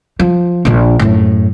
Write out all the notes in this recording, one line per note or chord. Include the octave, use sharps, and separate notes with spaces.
F3
A#1 D4
F#2 A2